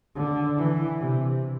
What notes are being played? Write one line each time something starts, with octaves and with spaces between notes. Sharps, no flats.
D3
E3
C3